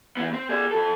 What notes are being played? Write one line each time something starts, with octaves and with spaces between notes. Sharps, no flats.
E3 B3
C4
G#4 D5
F2 A4